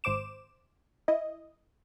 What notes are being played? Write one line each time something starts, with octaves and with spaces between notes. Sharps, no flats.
G#1 C5 D6 E7
E4 D#5